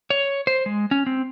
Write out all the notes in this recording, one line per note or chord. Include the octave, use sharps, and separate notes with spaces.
C#5
C5
G#3
C#4
C4